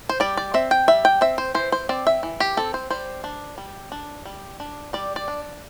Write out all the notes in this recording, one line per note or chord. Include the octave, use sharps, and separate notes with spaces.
C5
G3 D5
D5
C4 E5
G5
G3 E5
G5
C4 E5
C5
E3 C5
C5
C4 D5
E5
E3
G4
C4 A4
C5
G3 C5
D4
G3
D4
G3
D4
G3 D5
D5
D4